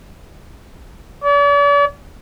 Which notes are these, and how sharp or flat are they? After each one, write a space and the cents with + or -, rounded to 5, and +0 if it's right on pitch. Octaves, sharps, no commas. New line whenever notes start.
D5 -45